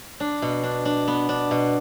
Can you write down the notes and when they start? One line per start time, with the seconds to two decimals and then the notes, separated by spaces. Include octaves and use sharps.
0.20 D4
0.42 B2
0.63 D4
0.85 D4
1.08 B3
1.29 D4
1.51 B2